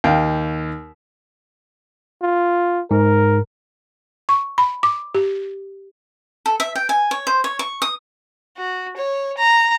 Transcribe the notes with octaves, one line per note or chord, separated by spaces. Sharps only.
D#2 F5 G5
F4
G#2 A#4
C#6
B5
D6
G4
A4
E5
G5
G#5
C#5
C5
C#5
C#6
D#6
F#4
C#5
A#5